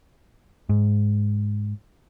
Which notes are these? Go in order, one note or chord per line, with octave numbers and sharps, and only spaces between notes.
G#2